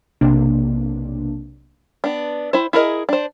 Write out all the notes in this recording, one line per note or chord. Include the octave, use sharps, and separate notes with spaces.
B1 C3 A#3 D4
B3 D4
E4 C5
E4 G#4 A#4 D#5
D4 C5